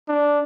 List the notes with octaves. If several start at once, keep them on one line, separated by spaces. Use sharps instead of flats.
D4